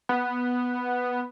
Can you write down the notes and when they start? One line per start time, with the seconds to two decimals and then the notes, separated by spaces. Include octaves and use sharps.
0.09 B3